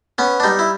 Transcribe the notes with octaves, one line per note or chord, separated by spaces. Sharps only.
B3 C#4
D4
G3 D#4
E4